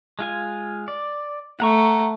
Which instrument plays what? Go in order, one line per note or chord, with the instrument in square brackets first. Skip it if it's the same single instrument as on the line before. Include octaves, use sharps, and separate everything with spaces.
[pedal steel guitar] G#3 F4 G#5
D5
[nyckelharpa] A3 [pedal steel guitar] F#5 A#5 C#6